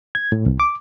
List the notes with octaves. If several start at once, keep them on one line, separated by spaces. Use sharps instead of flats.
G#6
A2
C2
D6